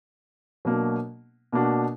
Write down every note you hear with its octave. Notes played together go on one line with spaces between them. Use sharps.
B2 F#3 A#3 D4
B2 A#3 D4 F#4